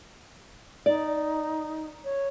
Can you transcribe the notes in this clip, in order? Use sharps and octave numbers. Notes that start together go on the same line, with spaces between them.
D#4 D5
C#5